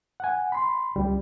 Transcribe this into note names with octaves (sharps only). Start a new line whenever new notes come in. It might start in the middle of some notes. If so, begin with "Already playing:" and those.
F#5 G#5
B5 C6
C#2 G3